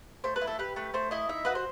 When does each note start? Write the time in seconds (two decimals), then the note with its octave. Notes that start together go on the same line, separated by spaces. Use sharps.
0.24 A3 C5
0.36 B4
0.41 E4
0.47 A4
0.59 G4 B4
0.76 A3 B4
0.94 A3 C5
1.11 E4 D#5
1.29 D#4 E5
1.45 F#4 B4
1.55 C5